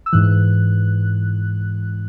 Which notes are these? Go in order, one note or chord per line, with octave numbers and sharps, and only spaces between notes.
E6
G#2 E3 F#6